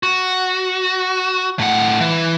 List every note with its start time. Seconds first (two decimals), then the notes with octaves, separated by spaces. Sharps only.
0.03 F#4
1.59 A2 F#5
2.00 E3